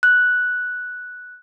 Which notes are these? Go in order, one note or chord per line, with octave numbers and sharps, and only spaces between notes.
F#6